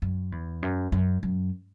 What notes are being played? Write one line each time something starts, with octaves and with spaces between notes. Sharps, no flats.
F#2
E2
F#2
F#2
F#2